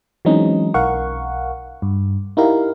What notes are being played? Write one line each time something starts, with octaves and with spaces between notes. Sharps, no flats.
E3 F#3 G#3 C4 C#4 D#4
B1 A#4 F5 F#5 C#6
G2
D#4 E4 G4 A#4 F5